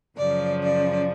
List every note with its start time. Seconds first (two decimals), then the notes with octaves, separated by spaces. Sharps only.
0.16 F#2 C#3 F3 D5
0.62 D5